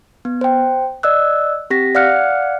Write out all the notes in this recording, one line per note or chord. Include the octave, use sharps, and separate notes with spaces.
B3
C5 G5
D5 D#5 E6 F#6
C4 G4 A#6 B6
D5 F5 F#5 F6 F#6 C#7